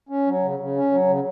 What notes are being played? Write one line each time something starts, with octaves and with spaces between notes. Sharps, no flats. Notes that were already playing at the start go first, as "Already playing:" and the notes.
C#4
F#3
C#3
C#3
C#4
F#3
C#3